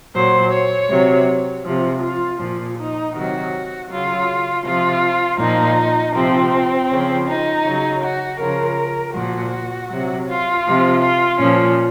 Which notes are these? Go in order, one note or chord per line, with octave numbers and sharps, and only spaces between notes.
A#2 F#3 C5
C#5
C3 F#3
C3 F3
F4
A#2 F3
D#4
C3 D#3 F#3 F#4
C#3 F#3 F4
C3 F3 F4
A#2 F3 D#4
C3 F3 C4
C#3 F3
D#4
C#3 F#3
F#4
C#3 F3 A#4
A#2 F3 F#4
C3 F#3
F4
C3 F3
F4
A#2 F3 C#4